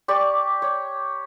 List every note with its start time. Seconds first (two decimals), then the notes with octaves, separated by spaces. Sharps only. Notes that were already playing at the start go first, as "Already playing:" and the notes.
0.08 G4 D5 C#6
0.62 C#5